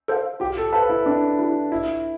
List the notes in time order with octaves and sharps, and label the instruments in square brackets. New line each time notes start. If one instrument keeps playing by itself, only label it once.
[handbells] A4 C5 F5
[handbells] F4 [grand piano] G4
[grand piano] A4
[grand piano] B4 [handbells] C5 F5 A5
[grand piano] E4
[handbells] C4 [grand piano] D4
[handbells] E4 G4
[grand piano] E4 [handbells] F4